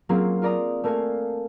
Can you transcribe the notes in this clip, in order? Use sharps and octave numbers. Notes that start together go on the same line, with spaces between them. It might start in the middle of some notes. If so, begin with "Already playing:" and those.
F#3 A#3 C4 C#4 F4 G#4
F4 A#4 D5 A#5 D#6
A3 A#3 A#4 F5 G#5